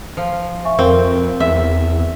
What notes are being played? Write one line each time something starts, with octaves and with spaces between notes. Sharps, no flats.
F3
E5 G#5 C#6
F2 C4 A#4 F5
E2 E5